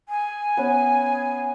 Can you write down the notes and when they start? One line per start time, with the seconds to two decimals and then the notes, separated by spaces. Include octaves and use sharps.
0.09 G#5
0.57 B3 C#4